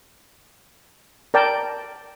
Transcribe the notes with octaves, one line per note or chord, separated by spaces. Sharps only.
A#4 D5 G5 A5